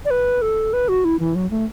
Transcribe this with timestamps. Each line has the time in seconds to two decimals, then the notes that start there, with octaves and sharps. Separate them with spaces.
0.05 D5
0.11 B4
0.42 A4
0.73 B4
0.89 F#4
1.05 E4
1.20 E3
1.35 F#3
1.51 A3